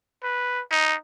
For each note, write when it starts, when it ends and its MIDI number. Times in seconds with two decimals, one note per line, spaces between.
0.23 0.61 71
0.72 0.95 63